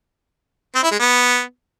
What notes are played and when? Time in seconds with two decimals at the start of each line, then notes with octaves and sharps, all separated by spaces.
0.75 C4
0.83 E4
0.91 G#3
0.99 B3